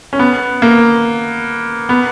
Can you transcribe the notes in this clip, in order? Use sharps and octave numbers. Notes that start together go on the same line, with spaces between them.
C#4
B3
A#3
B3